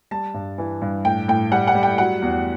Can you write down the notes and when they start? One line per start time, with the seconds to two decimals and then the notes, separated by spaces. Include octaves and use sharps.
0.11 G3 A5
0.34 G2
0.58 E3
0.82 G2
1.05 A2 G5
1.28 A2 G5
1.52 G3 F#5
1.67 F#5
1.75 G3
1.83 G5
1.98 F#3 F#5
2.22 E2